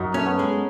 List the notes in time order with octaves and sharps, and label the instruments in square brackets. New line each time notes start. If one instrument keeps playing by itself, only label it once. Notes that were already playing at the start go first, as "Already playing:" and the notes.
Already playing: [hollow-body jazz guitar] F#2 [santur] D#4 F#4
[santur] A3 [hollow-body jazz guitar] C#4
[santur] B3
[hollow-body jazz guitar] G#3